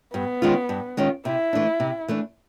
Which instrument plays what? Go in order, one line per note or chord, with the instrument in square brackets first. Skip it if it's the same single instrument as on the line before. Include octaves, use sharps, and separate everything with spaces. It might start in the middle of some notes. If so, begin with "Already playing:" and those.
[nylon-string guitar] G2 [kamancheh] B3
[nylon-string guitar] D#3 G#3 C#4 F4
G2
D#3 G#3 C#4 F4
[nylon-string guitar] C3 [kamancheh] E4
[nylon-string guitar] E3 A3 D4
C3
E3 A3 D4